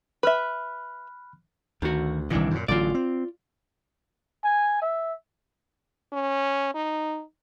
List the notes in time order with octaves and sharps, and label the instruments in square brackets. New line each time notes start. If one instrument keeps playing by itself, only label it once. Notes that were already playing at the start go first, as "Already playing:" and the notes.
[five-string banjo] B4 E5 [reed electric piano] B5 F6 F#6
[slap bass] D2 [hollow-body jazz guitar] D#3 F#4
[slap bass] C2 A#2 [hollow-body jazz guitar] D#3 E3 D4
[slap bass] F#2 A#2
[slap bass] A1 D3 F#3 [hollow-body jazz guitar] F4 D5
[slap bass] C4
[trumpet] G#5
E5
[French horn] C#4
D#4